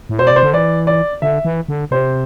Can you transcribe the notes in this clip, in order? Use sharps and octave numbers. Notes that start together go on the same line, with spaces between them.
A2
B2 C5
D5
C3 C5
D3
E3 D5
D5
D3 E5
E3
D3
C3 C5